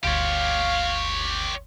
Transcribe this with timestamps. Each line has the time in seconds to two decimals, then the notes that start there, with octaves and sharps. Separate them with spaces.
0.04 G1 D2 G4 C#5 F5 C6